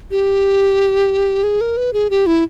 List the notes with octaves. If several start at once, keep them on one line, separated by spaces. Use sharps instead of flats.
G4
G#4
A#4
B4
G#4
G4
E4